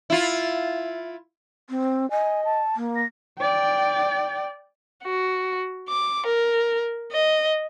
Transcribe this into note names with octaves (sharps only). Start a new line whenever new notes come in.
E4 F4
C4
D#5 G#5
A5
A#3
A#6
D5 G5
F#4
D6
A#4
D#5